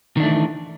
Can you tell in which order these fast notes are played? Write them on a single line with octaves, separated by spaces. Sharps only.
D#3 D4 A3 E3